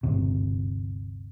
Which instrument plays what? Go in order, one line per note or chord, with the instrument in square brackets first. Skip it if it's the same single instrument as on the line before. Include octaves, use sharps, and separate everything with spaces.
[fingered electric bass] G1 D2 C3